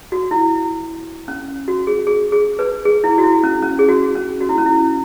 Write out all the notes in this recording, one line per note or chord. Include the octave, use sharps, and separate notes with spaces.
F#4
E4
C#4
F#4
G#4
G#4
G#4
B4
G#4
E4
F#4
E4
C#4
C#4
G#4
F#4
C#4
F#4
E4
C#4
E4